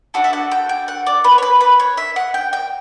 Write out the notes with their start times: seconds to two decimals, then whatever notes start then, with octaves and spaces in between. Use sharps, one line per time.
0.14 D4 F#4 A4
0.24 E5
0.33 F#5
0.51 G5
0.69 G5
0.88 F#5
1.06 D5
1.24 B4
1.38 C#5
1.43 B4
1.61 B4
1.80 C#5
1.97 E5
2.16 F#5
2.34 G5
2.53 G5